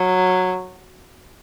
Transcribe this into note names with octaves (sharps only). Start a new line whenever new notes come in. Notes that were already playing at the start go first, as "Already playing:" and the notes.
Already playing: F#3